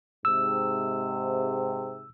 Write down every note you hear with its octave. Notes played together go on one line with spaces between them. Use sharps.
G#2 C3 E6